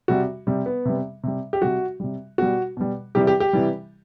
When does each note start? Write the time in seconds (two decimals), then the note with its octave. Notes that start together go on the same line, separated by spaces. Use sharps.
0.08 C3 G3 F#4
0.47 C3 G3
0.66 B3
0.85 C3 G3
1.23 C3 G3
1.53 G4
1.62 C3 G3 F#4
2.00 C3 G3
2.38 B2 G3 F#4
2.77 B2 G3
3.15 C3 E3 G3 G4
3.27 G4
3.40 G4
3.53 C3 E3 G3